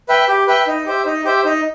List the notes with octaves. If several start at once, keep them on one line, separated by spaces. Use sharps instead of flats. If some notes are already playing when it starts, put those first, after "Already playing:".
B4 E5 G5
G4
B4 E5 G5
D#4
G4 C5 E5
D#4
G4 C5 E5
D#4